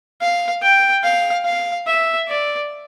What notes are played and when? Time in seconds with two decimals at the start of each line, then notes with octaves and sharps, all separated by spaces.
0.21 F5
0.62 G5
1.03 F5
1.45 F5
1.87 E5
2.28 D5